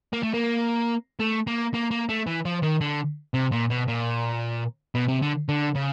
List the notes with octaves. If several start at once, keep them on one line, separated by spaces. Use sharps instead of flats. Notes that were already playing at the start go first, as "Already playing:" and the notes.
A#3
A3
A#3
A3
A#3
A#3
A#3
A3
E3
F3
D#3
D3
C3
A#2
B2
A#2
B2
C3
D3
D3
C#3